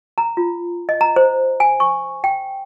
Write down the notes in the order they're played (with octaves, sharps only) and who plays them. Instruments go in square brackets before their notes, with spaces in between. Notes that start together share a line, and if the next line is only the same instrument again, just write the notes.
[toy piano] A#5
F4
D#5
A#5
C5
G#5
C#6
G5